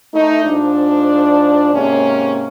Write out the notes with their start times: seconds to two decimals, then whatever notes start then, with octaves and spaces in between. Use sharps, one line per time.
0.14 A3 D#4
0.45 G#2 F3 D4
1.74 G#2 C3 A#3 C#4